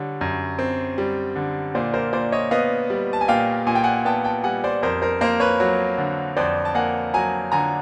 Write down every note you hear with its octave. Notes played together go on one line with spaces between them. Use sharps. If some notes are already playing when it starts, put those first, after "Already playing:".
Already playing: D3 G3 C#5
F#2
C4
G3
D3
A#2 C5 D5
A#4 C5
A#2 C5 D5
C#5 D#5
B3 D#5 F5
G3
A5
G#5
A#2 F5 G5
A#2 G#5
G5
F#5 G#5
B3 G5 A5
G5 A5
G3 F#5 G#5
C5 D5
F2 A#4 C5
A#4 C5
A#3 A#4 C5
B4 C#5
F#3
D3
F2 C5 D5
A5
A#3 F#5 G#5
F#3 G#5 A#5
D3 G#5 A#5